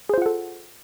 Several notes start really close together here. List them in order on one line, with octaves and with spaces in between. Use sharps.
G#4 C5 F4 F#5 A4